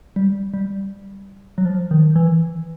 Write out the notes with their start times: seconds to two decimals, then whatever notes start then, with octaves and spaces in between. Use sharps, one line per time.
0.16 G3
0.54 G3
1.58 F#3
1.65 F3
1.91 D#3
2.16 E3